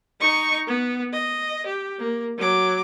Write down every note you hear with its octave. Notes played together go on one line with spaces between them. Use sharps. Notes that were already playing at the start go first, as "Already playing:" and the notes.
D#4 C#6
B3
D#5
G4
A#3
F#3 D6